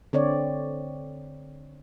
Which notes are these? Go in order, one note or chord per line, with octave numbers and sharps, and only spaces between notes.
D3 C4 C#5 D5